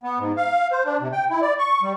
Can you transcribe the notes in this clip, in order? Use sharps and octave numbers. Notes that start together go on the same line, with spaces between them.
B3
G#2
F5
C5
D4
C3
G5
E4
D5
C#6
G3